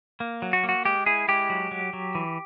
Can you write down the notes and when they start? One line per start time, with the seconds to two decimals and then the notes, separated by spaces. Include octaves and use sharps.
0.20 A#3
0.42 F#3
0.53 F#4
0.64 A#3
0.69 F#4
0.85 G#3 G4
1.06 E4 G#4
1.28 G#3 G4
1.50 F#3
1.71 F#3
1.93 F#3
2.15 E3